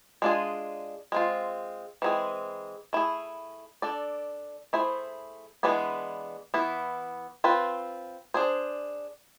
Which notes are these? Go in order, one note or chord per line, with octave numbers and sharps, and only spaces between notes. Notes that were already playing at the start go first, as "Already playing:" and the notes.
G#3 D4 F4 G#4
G#3 C4 F4
E3 G#3 C4 G#4
A3 E4 G#4
D4 A4 D5
A3 E4 G#4 C5
E3 G#3 B3 D4 G#4
E3 B3 E4
C4 F4 B4
D4 G#4 C5